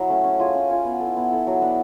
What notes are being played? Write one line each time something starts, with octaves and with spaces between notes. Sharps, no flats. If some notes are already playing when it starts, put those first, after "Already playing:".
Already playing: F#3 E4
A3 C#4
C#4
F4 G#4 C#5
C#4
F4 G#4 C#5
B3
A4
E4
B3
E4 A4
F#3
B3 D4 F#4